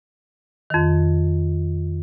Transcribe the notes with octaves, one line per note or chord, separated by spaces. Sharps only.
F2 D#3